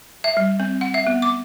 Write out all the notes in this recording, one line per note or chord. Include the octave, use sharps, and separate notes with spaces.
E5
G3
C4
F#5
E5
B3
D6